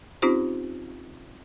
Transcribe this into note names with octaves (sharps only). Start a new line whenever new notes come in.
C4 C#4 D#4 F4 G4 C5